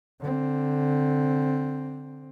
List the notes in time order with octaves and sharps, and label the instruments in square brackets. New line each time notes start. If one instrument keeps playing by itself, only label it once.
[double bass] D3 C4